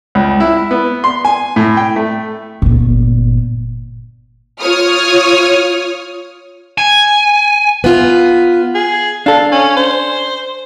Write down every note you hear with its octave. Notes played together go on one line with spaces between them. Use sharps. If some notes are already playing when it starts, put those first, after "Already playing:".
C#2
E4
B3
C6
G#5
A2
G5
A3
G1 A#2
F4 C#5 D#6 F6
G#5
B3 F4
G#4
D4 A4 F5
C#4
C5